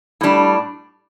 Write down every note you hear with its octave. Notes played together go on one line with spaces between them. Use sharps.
A2 G3 D4